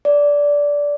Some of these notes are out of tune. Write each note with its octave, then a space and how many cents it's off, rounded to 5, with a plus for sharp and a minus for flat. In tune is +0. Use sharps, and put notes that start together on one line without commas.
D5 -15